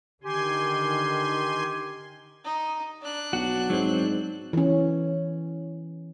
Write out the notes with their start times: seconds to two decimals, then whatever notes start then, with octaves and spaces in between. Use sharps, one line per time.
0.24 D3 D#3 G4 G#5 C6
2.44 D#4
3.01 D4 F#6
3.33 B1 F#4
3.70 G#2 F#3 C4
4.53 E3 C#4